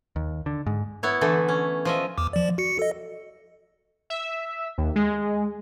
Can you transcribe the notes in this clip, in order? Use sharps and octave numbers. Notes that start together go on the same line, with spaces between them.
D#2
D3
G#2
B3 E4 C#5
D3 E3 A3 A4
C#4
F3 D#5 E5
E2 D6
F3 D5
F#4 C#7
A4 D#5
E5
D#2
G#3